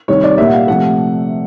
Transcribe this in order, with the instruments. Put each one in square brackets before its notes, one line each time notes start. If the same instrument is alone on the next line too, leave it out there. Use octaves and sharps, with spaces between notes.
[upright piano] C3 D#3 G3 C#5
D5
A#2 G3 A#3 E5
F#5
F5
C3 F3 A3 F#5